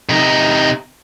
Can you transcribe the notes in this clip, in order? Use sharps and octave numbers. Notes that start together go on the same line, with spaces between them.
C3 D#4